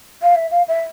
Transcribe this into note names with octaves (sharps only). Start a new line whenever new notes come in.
F5
E5
F5
E5